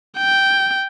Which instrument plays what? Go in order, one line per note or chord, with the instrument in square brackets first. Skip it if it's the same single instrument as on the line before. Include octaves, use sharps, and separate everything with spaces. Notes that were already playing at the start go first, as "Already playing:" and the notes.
[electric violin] G5